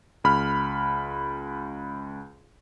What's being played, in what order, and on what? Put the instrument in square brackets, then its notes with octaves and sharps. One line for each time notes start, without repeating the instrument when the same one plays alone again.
[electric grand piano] C#2 B5 F6